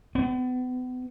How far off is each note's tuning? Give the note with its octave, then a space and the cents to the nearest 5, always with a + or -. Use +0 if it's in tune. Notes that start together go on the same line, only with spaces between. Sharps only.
B3 +35